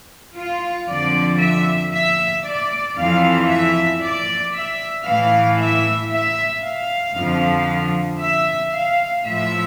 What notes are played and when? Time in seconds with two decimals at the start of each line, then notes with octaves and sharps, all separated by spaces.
0.35 F4
0.88 F2 D3 F3 D5
1.40 E5
1.93 E5
2.44 D5
2.97 F2 E3 F5
3.49 E5
4.01 D5
4.54 E5
5.05 A2 E3 F5
5.58 E5
6.10 E5
6.62 F5
7.15 F2 D3 F3
8.19 E5
8.71 F5
9.23 A2 F3 E5